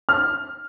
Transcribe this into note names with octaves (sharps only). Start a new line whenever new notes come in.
F6